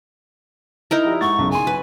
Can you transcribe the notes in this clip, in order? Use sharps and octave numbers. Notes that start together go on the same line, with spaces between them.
D#4 E4 A#4 D#5
F3 G4 D5
G#2 F#5 C#6 A6
B1 F#2 C#3
G#4 G#5 C6
F#3 B4